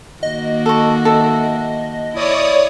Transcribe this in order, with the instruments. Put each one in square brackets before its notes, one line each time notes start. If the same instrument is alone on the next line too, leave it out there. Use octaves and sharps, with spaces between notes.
[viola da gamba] D#3 A#3 F#4 [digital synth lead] D#5
[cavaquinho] A4 C#6
A4 E5
[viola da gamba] E4 [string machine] C#5 D5 D#6